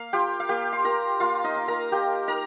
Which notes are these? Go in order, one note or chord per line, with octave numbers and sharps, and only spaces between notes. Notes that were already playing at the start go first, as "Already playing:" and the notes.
Already playing: A#3 F5
F4 G4 G5
F5
A#3 G4 G5
C6
F4 A#4 A#5
A#3 F4 F5
D#4 D#5
D#4
A#4 A#5
A#3 G4 G5
D#4 A#4 A#5